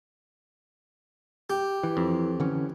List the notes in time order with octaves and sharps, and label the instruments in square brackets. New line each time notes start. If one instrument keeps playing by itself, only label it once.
[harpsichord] G4
[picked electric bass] E3
[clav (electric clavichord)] F2
[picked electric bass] D3 E3 C#4